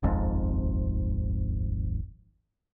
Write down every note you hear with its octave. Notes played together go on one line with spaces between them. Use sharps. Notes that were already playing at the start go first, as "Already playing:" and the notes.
D#1 G#1 F2 G#2